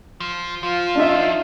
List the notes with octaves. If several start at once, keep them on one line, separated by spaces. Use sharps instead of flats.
F3
F3 F4
D4 D#4 E5